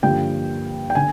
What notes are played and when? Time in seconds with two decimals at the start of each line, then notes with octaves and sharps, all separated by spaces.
0.03 G2 D3 F3 A#3 G5
0.90 G5
0.95 D3 G#5